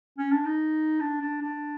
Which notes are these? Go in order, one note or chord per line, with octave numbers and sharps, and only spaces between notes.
C#4
D4
D#4
D4
D4
D4